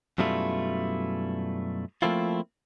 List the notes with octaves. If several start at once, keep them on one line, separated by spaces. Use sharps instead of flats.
F#2 B2 G3 A3 E4 F4
F3 A3 A#3 C4 E4 F4